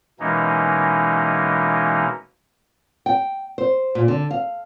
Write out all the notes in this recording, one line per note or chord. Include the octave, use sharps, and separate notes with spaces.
B2 E3 G#3 A#3 C#4 D#4
G5
C5
A#2
D3
F5